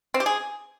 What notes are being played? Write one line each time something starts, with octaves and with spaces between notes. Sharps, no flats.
C4
G4
G#4